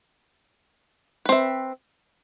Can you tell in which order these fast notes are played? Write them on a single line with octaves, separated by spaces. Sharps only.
B4 C4 E5